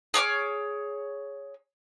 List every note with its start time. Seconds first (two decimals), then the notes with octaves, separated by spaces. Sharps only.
0.14 G#4 C#5 D6 F6